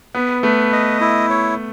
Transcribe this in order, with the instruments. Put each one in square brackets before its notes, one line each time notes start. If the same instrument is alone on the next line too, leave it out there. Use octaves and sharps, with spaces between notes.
[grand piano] B3 [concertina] B4
[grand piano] A3 [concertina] B4
[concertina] D#5
E4
C#5